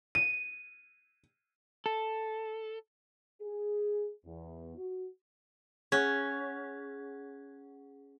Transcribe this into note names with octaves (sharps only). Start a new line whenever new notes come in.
D#7
A4
G#4
E2
F#4
C#4 G#4 F#5 F#6 G#6